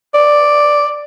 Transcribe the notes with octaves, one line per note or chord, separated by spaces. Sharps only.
D5